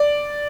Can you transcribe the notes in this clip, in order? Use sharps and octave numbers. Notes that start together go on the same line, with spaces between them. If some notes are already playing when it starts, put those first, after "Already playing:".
Already playing: D5